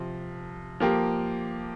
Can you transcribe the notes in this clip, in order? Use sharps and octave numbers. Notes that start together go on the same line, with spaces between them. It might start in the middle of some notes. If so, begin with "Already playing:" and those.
Already playing: C3 F3
F3 A#3 G4